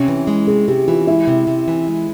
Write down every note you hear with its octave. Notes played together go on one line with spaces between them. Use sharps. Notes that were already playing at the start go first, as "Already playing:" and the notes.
Already playing: C3 C#4
E3
G#3
C3 G#4
C3 G4
E3 F4
G#3 E4
C3
C3
E3
G#3